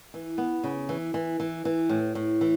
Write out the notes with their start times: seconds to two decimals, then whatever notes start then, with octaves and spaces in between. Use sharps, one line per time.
0.14 E3
0.38 B3
0.63 C#3
0.89 E3
1.14 E3
1.40 E3
1.65 E3
1.89 A2
2.15 A2
2.41 E3